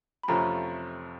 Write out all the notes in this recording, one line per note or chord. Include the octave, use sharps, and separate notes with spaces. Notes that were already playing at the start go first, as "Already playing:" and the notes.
B5
F2 C3 F3 A3 C#4 A#5